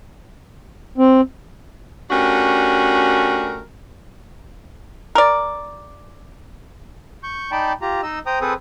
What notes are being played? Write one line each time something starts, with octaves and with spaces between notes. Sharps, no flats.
C4
A3 C#4 D4 F#4 G4 A#4
A#4 D5
C#6 G6
D#4 D5 G5 A5 B5
F4 G4 A#5
D#4 D#5 E6
C5 G5 A#5 D#6
C4 G#4 A4 B4 C5 D#6